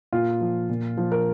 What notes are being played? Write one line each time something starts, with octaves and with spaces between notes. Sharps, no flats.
A#2 F4
F3
A#2
F3
A#4